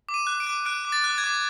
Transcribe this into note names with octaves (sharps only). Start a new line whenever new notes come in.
D6
D#7
F#6
D7
D6
F#6 D7
D6
A6
F#6
G#6
D6